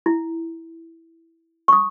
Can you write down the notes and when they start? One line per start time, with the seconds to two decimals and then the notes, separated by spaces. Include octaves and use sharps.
0.06 E4
1.68 C#6 D#6